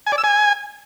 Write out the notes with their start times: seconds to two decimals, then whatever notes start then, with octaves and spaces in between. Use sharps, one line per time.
0.06 G#5
0.12 D5
0.18 E6
0.24 G#5